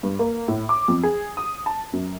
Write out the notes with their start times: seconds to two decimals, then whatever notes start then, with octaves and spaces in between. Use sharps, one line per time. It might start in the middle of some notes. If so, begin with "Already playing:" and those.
0.03 G2
0.19 A#3
0.48 A2
0.69 D6
0.88 F2
1.03 G#4
1.37 D#6
1.66 A5
1.93 F#2